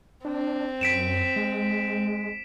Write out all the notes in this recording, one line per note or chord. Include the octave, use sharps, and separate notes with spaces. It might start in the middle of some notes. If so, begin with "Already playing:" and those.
C4 D4
F#2 B6 D7 E7
G#3